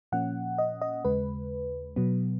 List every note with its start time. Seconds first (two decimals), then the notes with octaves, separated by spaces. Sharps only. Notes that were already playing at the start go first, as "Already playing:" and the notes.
0.12 A#2 F3 A#3 C#4 F#5
0.58 D#5
0.82 D#5
1.04 D#2 C#3 G#3 B4
1.96 B2 F#3 B3